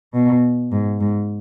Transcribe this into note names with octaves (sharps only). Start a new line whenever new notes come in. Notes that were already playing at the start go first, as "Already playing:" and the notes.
B2
G#2
G#2